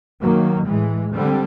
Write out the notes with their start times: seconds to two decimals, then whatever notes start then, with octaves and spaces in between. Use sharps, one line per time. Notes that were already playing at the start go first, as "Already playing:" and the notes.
0.21 D#3 F#3 A#3
0.65 A2 E3 G#3
1.12 D3 G3 C4